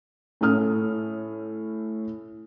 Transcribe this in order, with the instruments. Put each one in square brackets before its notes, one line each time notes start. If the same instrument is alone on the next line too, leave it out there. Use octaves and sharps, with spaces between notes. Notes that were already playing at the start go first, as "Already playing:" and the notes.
[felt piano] A2 C#4 A4 D#6 F6